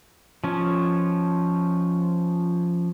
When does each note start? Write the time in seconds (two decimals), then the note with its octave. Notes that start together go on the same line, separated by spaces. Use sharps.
0.44 F3 C#4